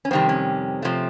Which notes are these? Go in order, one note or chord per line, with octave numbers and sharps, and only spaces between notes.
C#4
F2 C3 D#3 G3 C4
C#4
C3 F3 A3